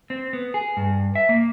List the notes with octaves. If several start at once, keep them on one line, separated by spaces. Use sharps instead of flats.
C4
B3
G#4
G2
E5
A#3